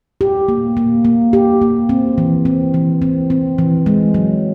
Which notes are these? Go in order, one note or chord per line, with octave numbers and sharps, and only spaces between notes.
G4
A#3
A#3
A#3
G4
A#3
C4
E3
C4
E3
C4
C4
E3
G#3
F#3